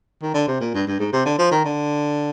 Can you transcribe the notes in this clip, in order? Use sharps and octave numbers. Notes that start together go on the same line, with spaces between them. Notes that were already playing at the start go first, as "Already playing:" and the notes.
D#3
D3
C3
A#2
G2
G2
G#2
C3
D3
F3
D#3
D3